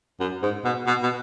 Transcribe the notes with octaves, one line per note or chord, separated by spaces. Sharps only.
F#2
G#2
B2
B2
B2